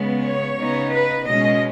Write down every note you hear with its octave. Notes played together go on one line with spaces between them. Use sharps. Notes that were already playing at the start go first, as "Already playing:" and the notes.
Already playing: C#3 G#3 B3
C#5
C#3 B3 D#4
B4
B2 G#3 C#4 D#5